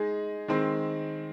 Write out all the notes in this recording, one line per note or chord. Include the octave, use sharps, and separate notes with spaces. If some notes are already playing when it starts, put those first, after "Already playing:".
Already playing: G#3 D#4 G#4
D#3 G#3 C4